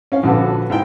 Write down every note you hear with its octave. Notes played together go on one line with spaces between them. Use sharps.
C#4 F5
A#1 D3 F#4 A4 B4
G#2 E4 G5